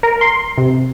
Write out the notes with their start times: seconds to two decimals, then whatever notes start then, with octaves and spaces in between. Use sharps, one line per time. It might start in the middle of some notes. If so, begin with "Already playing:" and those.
0.03 A#4
0.21 C6
0.58 C3